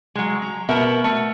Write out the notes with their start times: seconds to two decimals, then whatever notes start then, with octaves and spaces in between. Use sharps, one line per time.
0.15 F#3 G#3
0.42 A#5
0.69 B2 B3 A#4 E5
1.04 A3